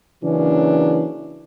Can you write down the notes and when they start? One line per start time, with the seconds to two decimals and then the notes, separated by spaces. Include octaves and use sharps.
0.23 C#3 E3 F#3 A#3 C#4 D4